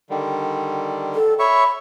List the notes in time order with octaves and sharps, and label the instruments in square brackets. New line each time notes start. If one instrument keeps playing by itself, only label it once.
[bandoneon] D3 D#3 G3
[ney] A4
[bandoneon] C#5 E5 C#6 [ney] B5